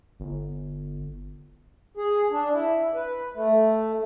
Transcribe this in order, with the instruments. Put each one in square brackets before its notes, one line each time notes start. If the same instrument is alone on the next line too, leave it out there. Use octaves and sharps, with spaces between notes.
[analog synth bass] G1
[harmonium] G#4
D4
E4
B4
A3